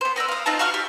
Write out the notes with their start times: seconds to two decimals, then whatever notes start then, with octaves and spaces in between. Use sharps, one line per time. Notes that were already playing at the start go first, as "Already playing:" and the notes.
0.01 B3 C5
0.16 B3 A#4 D5 E6
0.28 F5 D#6
0.46 C4 D#4 F4 A5
0.59 F#4 F5 C#6 F6
0.74 G4